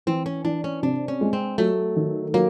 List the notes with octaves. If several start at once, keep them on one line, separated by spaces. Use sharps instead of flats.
E3 C4
C#4
E3 D4
C#4
C3 D4
C#4
G#3
C4
F#3 A3
D#3
F#3 A#3